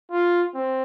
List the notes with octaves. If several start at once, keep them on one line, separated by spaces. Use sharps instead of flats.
F4
C4